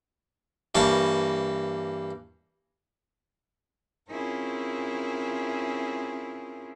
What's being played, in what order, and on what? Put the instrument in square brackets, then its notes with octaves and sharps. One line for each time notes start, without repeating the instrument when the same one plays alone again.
[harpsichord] G2 E3 A#3 C#5 A5
[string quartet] C4 C#4 E4 F4 G#4 A#4